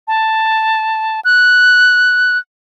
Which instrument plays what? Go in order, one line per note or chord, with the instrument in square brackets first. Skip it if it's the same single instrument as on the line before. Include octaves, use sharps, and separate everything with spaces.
[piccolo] A5
F#6